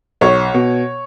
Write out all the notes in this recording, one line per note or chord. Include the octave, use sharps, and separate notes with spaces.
B1 C#5
B2